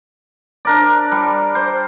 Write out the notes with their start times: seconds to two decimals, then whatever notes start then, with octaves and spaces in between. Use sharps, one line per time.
0.65 D4 A#4 D5
1.12 G3
1.55 C5